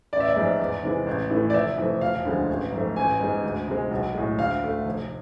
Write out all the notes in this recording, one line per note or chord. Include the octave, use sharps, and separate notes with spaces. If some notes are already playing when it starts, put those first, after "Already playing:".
A1 D5
E5
D5
G#2 F3 G#3
E2
C3 E3 G#3
A1
A2 E3 A3
D5
F1 E5
F2 E3 A3
E1 F5
D2 D3 F3 G#3
A1
G#2 F3 A3
A1 G#5
G#2 G#3
D2
C3 G#3
B1
A2 G#3
D2 F5
D3 A3
F1